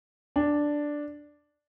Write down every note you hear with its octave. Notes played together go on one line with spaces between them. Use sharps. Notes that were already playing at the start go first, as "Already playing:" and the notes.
D4